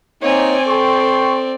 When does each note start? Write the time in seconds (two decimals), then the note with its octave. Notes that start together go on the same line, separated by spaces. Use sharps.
0.22 A#3 C4 D#4 C#5 D5 G#5
0.68 A4 G5 C6 C#6